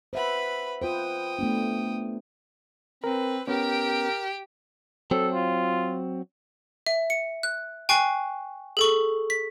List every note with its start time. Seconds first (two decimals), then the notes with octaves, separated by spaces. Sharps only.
0.13 B4 C5 E5 F#5 B5
0.81 F4 B4 C5 G5 D#6
1.39 A3 B3 D4
3.04 C4 A#4 B4
3.48 B3 C#4 G4 A#4 G5
5.11 F#3 C4 A4
5.34 F4
6.87 E5
7.10 C#7
7.43 F#6
7.89 G5 G#5 C#6 F#6 C7
8.77 G#4 A4 C#6
9.30 B6